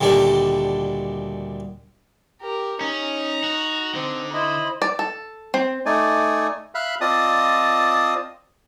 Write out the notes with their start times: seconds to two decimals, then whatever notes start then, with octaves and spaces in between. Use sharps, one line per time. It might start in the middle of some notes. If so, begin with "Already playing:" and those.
0.01 D2 A#2 D#3 G3 D4
2.42 G4 A#4
2.81 C#4 D#4 A#5
3.44 F#4
3.95 D3 C4
4.33 E4 C5 D#5 B5
4.82 D5
4.99 A4
5.54 C4
5.86 A3 D#4 D5 G#5
6.75 E5 F5 B5 F#6
7.01 C4 F4 D5 D#5 A5 D#6